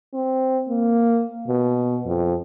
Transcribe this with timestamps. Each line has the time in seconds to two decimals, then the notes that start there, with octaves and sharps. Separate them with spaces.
0.14 C4
0.69 A#3
1.48 B2
2.06 F2